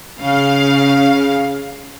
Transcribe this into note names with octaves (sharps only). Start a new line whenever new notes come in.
C#3 F5